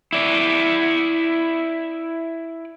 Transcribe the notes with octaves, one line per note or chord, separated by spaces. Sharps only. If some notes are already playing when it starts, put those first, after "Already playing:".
E4 D5